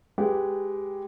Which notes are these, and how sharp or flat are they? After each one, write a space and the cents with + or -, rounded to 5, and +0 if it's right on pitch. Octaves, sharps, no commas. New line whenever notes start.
G#3 +0 G4 +0 B4 +0